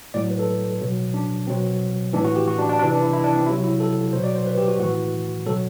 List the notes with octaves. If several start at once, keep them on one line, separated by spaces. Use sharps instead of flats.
A2 F#3 D5
B4
A4
B2 F#3
D4
B2 F#3 C4
A2 E3 D4
F#4
G4
F#4
D4
D4
C3 E3 D4
D4
E4
E4
D4
C4
C3 F#3 E4
E4
A4
B2 F#3 C5
D5
C5
B4
G4
F#4
A2 E3 F#4
B2 F#3 A4